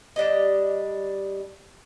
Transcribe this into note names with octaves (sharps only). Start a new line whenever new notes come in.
G3 D4 G4 D#5